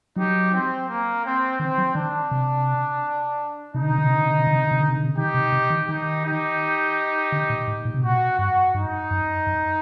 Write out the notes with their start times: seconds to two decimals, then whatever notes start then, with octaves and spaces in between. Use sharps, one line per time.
0.16 F#3 D#4 G4
0.52 C4
0.88 A#3
1.24 C4
1.59 D#3 C4
1.78 F#3
1.95 D#3 D4
2.31 C3
3.74 C3 D#4
3.82 D3
3.91 C3
3.98 D3
4.06 C3
4.15 D3
4.22 C3
4.31 D3
4.40 C3
4.47 D3
4.55 C3
4.64 D3
4.71 C3
4.80 D3
4.89 C3
4.97 D3
5.05 C3
5.17 D#3 D#4 G4
5.34 C3
5.52 C3
5.70 D#3
5.88 D#3 D#4 G4
6.24 D#4 G4
7.32 D3
7.50 A#2
7.67 A2
7.85 A#2
7.94 C3
8.03 A#2 F#4
8.38 G2 F#4
8.74 G2 D#4
9.11 F#2
9.47 F#2